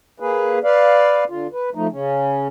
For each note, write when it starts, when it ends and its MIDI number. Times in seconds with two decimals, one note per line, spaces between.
0.20 0.59 58
0.20 0.59 68
0.20 0.59 71
0.64 1.24 71
0.64 1.24 74
0.64 1.24 77
1.30 1.47 50
1.30 1.47 65
1.53 1.70 71
1.75 1.87 53
1.75 1.87 57
1.75 1.87 63
1.92 2.48 49
1.92 2.48 61